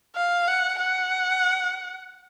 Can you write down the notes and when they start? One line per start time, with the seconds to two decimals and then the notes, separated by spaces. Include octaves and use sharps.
0.16 F5
0.47 F#5
0.79 F#5